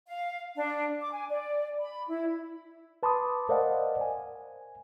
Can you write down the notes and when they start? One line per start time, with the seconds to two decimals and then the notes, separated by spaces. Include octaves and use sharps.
0.07 F5
0.55 D4
1.00 D6
1.12 G#5
1.29 D5
1.80 B5
2.09 E4
3.03 B4 A5 B5 C6 D6 D#6
3.49 A#4 C5 D5 D#5 F5 F#5
4.01 G#5